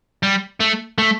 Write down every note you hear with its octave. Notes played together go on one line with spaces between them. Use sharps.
G3
A3
A3